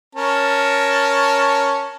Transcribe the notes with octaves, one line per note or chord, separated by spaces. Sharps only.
C#4 A#4 A5